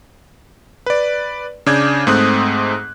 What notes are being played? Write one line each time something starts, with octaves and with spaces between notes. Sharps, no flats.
B4 D5
C#3 D4 D6 G6 G#6
G#2 A3 C4 D#6 F#6